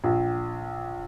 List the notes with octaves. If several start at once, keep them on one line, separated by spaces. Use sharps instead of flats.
A#1